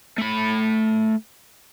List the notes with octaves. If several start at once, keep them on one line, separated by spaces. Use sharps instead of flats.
A3 B5